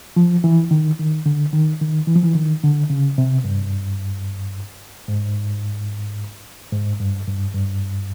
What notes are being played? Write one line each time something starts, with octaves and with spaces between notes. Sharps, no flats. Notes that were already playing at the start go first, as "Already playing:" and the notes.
F3
E3
D#3
D#3
D3
D#3
D#3
E3
F3
E3
D#3
D3
C#3
C3
G2
G#2
G#2
G2
G2
G2